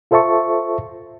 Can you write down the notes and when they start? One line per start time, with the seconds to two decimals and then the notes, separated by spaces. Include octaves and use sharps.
0.11 F4 A4 C5 E5 A5 C#6